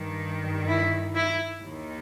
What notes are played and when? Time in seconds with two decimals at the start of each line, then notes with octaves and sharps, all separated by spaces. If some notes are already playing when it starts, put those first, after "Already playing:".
Already playing: G2 D#3
0.68 E4
1.15 E4
1.62 D#2 D#3